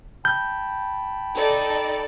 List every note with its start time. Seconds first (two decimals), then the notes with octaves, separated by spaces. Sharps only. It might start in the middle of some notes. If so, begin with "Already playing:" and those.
0.25 G5 A5 B5 G6
1.36 D#4 A4 D5